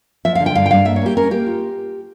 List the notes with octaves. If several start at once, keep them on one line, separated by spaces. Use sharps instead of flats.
F3 E5
F5
D3
G5
G2 F5
G5
G2 F5
A#3 E5
C#5
A#3 G4
C#4 A#4
A#3 G4
F4